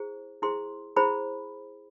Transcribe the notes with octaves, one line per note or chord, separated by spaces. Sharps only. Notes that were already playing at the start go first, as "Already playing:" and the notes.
Already playing: E4 G#4 C5
E4 G#4 C5 C6
E4 G#4 C5 B5